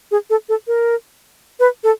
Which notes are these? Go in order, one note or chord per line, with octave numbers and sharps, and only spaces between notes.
G#4
A4
A4
A#4
B4
A4